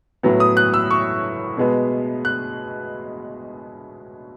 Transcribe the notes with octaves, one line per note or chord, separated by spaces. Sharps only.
A2 F#3 B3
D#6
F#6
E6
C#6
B2 G#3 B3
F#6